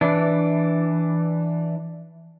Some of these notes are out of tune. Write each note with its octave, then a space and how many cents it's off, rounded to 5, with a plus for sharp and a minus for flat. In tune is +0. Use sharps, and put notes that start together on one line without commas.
E3 +0 D4 +0